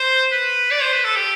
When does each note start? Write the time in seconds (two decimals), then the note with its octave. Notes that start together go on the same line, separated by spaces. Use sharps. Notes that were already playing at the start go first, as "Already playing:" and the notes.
Already playing: C5
0.32 B4
0.71 D5
0.82 C5
0.93 B4
1.05 A4
1.16 G4